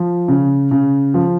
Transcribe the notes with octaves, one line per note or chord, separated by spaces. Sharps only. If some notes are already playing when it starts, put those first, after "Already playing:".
Already playing: F3
C#3
C#3
F3